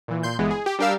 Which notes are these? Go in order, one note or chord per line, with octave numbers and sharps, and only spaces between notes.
A#2 E3
A#2 C6 G6
G1 E3 G#3 B3
G#4
G4
G3 D4 G4 A#4 F5 E6